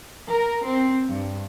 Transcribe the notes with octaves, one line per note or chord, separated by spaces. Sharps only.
A#4
C4
G2